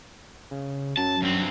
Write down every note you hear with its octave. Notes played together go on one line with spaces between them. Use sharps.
C#3
F#2 F#3 A5
G2 F#3 C4